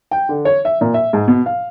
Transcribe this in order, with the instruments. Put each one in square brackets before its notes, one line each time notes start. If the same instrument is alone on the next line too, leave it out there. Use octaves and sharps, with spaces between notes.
[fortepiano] G5
D3
C#5
E5
A#2
E5
G#2
B2
F5